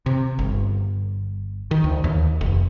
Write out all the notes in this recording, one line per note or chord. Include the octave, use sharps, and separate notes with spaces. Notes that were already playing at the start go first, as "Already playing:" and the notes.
C3
G1
D#3
D2
D#2
F1